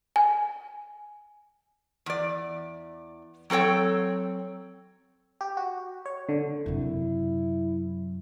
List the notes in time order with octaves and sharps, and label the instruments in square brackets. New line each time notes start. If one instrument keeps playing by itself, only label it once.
[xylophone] G#5
[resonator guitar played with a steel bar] E2 D5
F#3 C4 A4 C#5 G5
[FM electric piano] G4
F#4
C#5
D3
[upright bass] F#2 C3 [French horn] E4